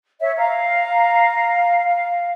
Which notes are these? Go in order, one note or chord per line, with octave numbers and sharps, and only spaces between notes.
C#5 E5
F5 A#5
F5